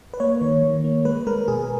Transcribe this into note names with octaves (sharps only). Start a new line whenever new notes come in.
B4
A#3 C#5
D#3
D#3
A#3
G#3 B4
G#3 A#4
B2 G#4